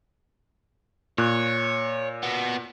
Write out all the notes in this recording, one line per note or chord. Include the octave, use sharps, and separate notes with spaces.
A#2 C#5 F#6
B2 B3